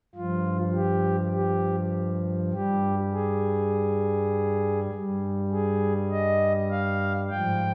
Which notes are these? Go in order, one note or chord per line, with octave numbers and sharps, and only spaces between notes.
G2 F3 F4
G4
G4
G2 G3 G4
G#4
G2 G3
G#4
D#5
F5
G#2 F3 G5